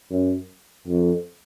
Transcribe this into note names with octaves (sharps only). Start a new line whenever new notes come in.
F#2
F2